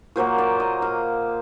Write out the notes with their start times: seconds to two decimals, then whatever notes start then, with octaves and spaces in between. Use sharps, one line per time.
0.16 A#2 F#3 A#3 C5
0.38 D5
0.60 D#5
0.82 F5